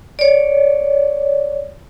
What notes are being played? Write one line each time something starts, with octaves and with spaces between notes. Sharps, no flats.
C#5 D5